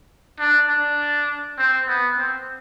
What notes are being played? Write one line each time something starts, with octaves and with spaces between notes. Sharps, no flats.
D4
D4
C4
B3
C4